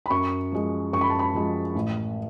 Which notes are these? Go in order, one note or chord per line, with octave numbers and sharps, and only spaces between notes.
B5
F#2 C#6
F3 G#3
F#2 C#6
B5
A5
B5
F3 G#3
A1